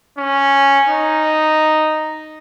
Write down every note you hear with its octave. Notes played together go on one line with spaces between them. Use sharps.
C#4
D#4